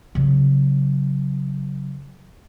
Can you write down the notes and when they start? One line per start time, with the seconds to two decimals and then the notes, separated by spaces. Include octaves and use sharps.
0.15 C#3 F#3